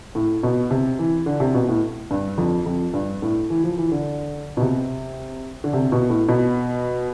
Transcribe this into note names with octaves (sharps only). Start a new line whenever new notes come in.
A2
B2
C3
E3
D3
C3
B2
A2
G2
F2
F2
G2
A2
E3
F3
E3
D3
B2
C3
D3
C3
B2
A2
B2